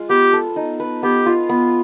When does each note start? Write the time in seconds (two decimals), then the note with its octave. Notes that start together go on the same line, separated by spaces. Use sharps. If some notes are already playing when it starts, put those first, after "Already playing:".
Already playing: G#3 F4
0.09 B3 G4
0.33 A4
0.56 D#4
0.80 B4
1.03 B3 G4
1.26 F4
1.49 B3